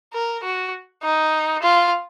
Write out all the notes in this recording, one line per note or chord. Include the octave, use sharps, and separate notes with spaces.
A#4
F#4
D#4
F4